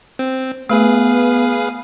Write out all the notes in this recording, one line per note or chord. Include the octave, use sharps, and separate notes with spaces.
C4
A3 B3 G#4 B4 F5